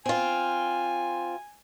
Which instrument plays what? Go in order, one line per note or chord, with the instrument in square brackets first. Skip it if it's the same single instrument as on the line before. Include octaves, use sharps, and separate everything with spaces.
[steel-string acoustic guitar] C4 F4 [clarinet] G#5